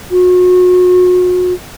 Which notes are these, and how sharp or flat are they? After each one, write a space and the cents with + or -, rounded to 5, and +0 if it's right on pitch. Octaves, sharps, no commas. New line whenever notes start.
F#4 -35